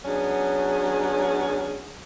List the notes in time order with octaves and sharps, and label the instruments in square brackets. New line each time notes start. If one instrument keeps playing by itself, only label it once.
[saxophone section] F#3 B3 C#4 D4 G#4